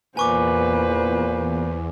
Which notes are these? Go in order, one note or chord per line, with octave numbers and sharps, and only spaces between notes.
E2 A#2 B4 C5 G#5 C#6 D6